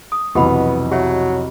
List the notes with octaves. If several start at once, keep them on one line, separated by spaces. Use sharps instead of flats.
D#6
F1 B1 E3 B3 G4 F#5 B5
F#3 G4 C#5 E5